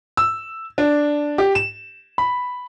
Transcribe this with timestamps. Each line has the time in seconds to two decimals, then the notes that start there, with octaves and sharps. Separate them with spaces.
0.17 E6
0.78 D4
1.38 G4
1.55 E7
2.18 B5